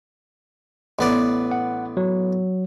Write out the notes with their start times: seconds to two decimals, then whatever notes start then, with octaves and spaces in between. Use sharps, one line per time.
0.99 A1 B3 D5
1.51 F#5
1.97 F#3